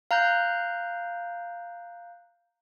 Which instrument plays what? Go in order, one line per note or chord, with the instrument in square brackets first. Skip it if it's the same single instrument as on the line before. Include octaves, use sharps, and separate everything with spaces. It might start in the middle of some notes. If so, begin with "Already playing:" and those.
[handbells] F5 A#5 F#6 G6